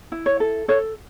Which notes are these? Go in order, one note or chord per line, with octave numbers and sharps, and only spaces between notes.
E4
C#5
A4
A4 C#5